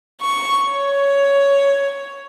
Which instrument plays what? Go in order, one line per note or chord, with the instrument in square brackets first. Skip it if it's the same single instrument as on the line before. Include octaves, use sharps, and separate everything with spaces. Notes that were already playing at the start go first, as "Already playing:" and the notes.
[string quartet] C#6
C#5